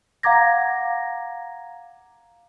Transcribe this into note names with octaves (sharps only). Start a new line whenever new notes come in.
F5 F#5 A#5 D6 G#6 A#6